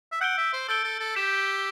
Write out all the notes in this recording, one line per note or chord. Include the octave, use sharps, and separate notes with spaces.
E5
F#5 E6 G6 D7 G7
E5
C5
A4 E6 G6 D7 G7
A4
A4
G4 G6 B6 E7